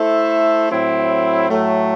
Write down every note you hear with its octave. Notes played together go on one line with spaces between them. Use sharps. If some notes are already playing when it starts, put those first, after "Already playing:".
Already playing: A3 E4 A4 C5 E5
A2 F#3 C4 E4
A2 F#3 A3